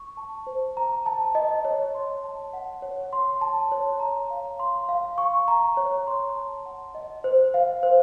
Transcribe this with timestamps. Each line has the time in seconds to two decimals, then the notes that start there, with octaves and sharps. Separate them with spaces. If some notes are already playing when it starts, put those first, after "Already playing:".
Already playing: C#6
0.17 A5
0.47 C5
0.77 A#5
1.06 A5
1.35 D#5
1.65 C#5
1.95 C6
2.24 A5
2.53 F#5
2.82 C#5
3.13 C6
3.41 A5
3.72 C#5
4.00 A#5
4.31 F5
4.59 C6
4.89 F5
5.18 C#6
5.48 A#5
5.77 C#5
6.07 C6
6.36 A5
6.66 F#5
6.95 D#5
7.24 C5
7.54 F5
7.83 C5